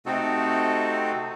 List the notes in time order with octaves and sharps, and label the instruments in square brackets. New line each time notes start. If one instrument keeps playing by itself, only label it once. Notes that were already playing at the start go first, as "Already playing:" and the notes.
[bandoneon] C3 A3 C4 D#4 F#4 A4